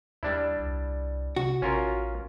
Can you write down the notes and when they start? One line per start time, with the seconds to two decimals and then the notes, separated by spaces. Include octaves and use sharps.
0.23 D#2 G3 D4 E4
0.60 C2
1.36 C3 F#4
1.62 A1 C#4 F4 A#4